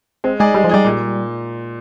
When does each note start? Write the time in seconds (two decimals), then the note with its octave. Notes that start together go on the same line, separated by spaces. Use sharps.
0.24 G#3 C4
0.40 G#3 D#4 G#4 D5
0.54 G3 G#3
0.64 F3
0.69 G3 D#4 G#4 D5
0.85 A#2